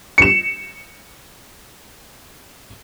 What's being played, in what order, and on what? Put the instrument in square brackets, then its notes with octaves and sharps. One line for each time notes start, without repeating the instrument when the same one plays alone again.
[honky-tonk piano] C#7 E7